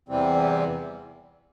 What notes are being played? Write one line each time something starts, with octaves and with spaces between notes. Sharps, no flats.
E2 C3 E3 G3 C4